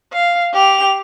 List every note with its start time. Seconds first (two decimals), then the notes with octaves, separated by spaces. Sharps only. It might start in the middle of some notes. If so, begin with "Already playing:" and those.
0.13 F5
0.53 G4 F7